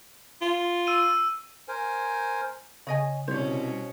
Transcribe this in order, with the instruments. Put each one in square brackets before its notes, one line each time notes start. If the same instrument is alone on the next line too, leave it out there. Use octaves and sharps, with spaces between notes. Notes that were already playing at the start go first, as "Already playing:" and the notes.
[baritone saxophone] F4
[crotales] E6 D#7
[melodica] A#4 C5 G#5
[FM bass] C#3 [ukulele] C#5 D#5 G#5
[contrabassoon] C2 [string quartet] B2 C#4 [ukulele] C5 C#5